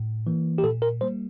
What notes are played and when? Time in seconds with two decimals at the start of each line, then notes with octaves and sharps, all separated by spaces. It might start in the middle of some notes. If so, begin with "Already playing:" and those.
Already playing: A2
0.27 E3 A#3
0.58 G4
0.63 A#2 A4
0.82 A#4
1.01 G3 A#3 C5